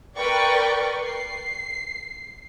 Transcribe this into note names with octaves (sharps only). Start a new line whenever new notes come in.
A#4 B4 D5 G5 C#6
C7